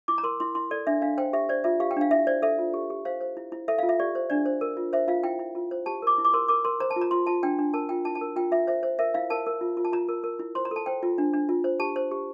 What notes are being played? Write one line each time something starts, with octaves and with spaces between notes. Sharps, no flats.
E4 D6
A#5
A#4 C6
E4 C6
E4 C6
A4 D5
D4 E5
D4 F5
C5 G5
G4 E5
C5 D5
F4 E5
G4 F5
G5
D4 F5
E4 E5
C5 D5
A4 E5
F4
G4
G4
C5 F5
C5
E4
E4
A4 E5
F5
F4
E5
G4 D5
C5
D4 D5
C5
A#4
F4
C5 E5
F4 F5
E4 G5
E4
F4
C5
G4 A5
A#4 D6
E4
D6
A#4 C6
A#4 D6
A#4 C6
C5 A#5
A5
F4
A#5
F4 C6
F4 A5
D4 G5
D4
A#4 A5
F4 G5
E4 A5
A5
A#4
F4 G5
F4 E5
C5 E5
C5
A#4 E5
E4 F5
A#4 A5
A#4
F4
F4
A5
F4 A#5
A#4
A#4
E4
C5 C6
A#5
A4 A5
C5 G5
F4
D4
D4
F4
C5
G4 A5
C5
G4